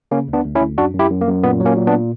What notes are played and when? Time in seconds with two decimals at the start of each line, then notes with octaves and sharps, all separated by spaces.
0.11 C#3 A#3 C#4
0.28 D2
0.33 B3 D4
0.45 D2
0.56 C#4 E4
0.61 D2
0.78 F#2 D4 F#4
0.94 F#2
0.99 E4 G4
1.10 F#2
1.21 A#3
1.27 F#2
1.43 A#2 B3
1.60 F#3
1.65 A#3 C#4
1.77 A#2
1.87 B3 D4